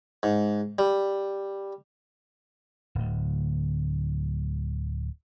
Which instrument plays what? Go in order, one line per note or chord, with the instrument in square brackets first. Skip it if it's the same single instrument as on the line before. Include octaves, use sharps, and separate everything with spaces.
[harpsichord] G#2
G3
[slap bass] D1 D2